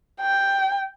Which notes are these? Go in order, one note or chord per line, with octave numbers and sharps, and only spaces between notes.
G5